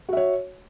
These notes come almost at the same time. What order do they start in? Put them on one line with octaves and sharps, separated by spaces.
F#4 E5 C#5